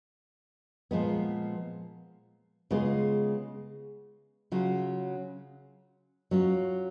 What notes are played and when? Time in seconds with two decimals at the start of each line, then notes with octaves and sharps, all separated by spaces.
0.91 A#2 F3 G#3 B3
2.71 C#3 G#3 B3 F4
4.52 C#3 F#3 C#4 F4
6.31 F#3 C#4 F4